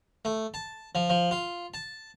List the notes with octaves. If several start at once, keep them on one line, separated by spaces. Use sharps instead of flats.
A3
A5
F3
F3
F4
A5